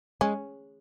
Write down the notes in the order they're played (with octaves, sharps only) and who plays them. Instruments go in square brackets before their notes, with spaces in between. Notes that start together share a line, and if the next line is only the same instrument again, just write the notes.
[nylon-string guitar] G#3 [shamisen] C#4